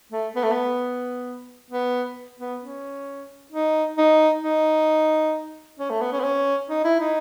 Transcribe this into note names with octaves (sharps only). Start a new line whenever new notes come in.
A3
B3
A3
B3
B3
B3
C#4
D#4
D#4
D#4
C#4
A3
B3
C#4
B3
C#4
D#4
E4
D#4